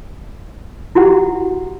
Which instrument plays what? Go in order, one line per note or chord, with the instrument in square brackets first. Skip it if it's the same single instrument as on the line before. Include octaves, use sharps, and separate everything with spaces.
[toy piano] E4 F#4 G4 F#5